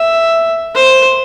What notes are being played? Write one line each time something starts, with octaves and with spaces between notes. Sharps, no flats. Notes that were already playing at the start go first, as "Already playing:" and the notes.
Already playing: E5
C5